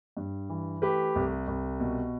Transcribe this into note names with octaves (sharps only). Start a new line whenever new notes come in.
G2
E3
A3 G4 B4
C2
C2
B2